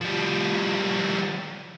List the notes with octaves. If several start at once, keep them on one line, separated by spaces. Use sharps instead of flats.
F3 G3